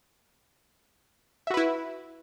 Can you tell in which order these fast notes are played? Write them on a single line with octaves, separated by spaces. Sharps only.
E5 F#4 B4 E4